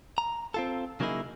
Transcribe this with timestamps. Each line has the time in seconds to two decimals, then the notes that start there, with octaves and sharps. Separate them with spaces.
0.18 A#5
0.54 C4 F4 A4
1.00 C#3 F#3 A#3 D#4 E4 G#4